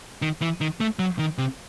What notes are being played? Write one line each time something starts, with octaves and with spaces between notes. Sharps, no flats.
D#3
E3
D#3
A3
F#3
D#3
C3